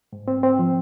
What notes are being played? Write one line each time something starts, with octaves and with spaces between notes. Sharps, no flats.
G#2
C4
C4
F3